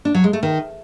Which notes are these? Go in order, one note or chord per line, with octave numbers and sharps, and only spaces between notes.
D4
F#3
G#3
A3
D#3